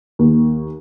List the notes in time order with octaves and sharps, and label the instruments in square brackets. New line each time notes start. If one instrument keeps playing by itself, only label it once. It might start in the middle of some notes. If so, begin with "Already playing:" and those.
[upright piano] D#2